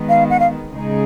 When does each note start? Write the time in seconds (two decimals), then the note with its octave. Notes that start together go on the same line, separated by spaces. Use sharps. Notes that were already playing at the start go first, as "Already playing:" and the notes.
Already playing: D#3 G#3 B3
0.09 F5
0.30 F#5
0.40 F5
0.71 C#3 G#3 D#4 G#4